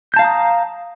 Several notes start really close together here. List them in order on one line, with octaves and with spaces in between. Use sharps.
G6 A5 F5 A#5 D#6